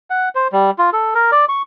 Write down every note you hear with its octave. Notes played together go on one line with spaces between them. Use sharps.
F#5
C5
G3
F4
A4
A#4
D5
C#6